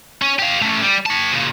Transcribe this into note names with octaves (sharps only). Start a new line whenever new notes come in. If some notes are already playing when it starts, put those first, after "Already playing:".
C#4
G4 F5
A3 C#4
G3
C#5 A5
A#2 C#3